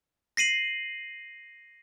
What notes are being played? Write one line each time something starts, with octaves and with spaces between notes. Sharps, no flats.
A#6 C7 D#7 F#7